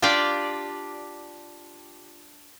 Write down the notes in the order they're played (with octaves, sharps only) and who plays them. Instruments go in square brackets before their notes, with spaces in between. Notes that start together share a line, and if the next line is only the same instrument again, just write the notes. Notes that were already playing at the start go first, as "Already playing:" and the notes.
[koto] D4 F4 G4 D5 G5